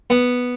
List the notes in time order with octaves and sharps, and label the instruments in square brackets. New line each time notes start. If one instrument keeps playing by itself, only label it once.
[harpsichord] B3